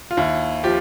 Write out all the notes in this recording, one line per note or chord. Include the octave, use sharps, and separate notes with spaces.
F4
D#2 E4
F3 G4